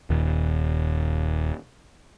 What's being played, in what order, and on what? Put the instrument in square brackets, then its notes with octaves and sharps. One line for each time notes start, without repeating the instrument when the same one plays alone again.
[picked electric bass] D#1 D#2